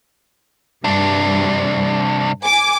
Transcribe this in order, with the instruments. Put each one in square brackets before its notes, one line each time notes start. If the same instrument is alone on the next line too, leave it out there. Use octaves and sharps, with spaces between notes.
[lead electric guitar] C2 D4 [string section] G2
[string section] G#5 D6